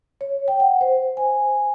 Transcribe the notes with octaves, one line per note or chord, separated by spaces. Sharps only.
C#5
G5
F#5
C5
G#5